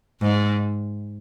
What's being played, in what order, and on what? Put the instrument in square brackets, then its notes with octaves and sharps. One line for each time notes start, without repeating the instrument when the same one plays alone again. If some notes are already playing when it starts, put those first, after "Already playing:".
[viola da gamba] G#2